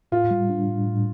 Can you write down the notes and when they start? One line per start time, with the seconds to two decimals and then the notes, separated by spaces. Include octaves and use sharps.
0.12 A2 F4
0.31 G3
0.50 D4
0.68 A2
0.87 A2